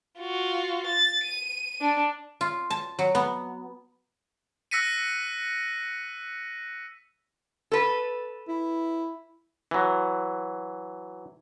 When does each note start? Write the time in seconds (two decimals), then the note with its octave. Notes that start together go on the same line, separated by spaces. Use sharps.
0.20 F4 F#4
0.87 A6
1.24 D#7
1.81 D4
2.41 F4
2.70 A5
2.99 F#3
3.15 B3
4.71 E6 F#6 A#6 B6 C#7 D#7
7.72 A4 B4
8.48 E4
9.71 E3 F#3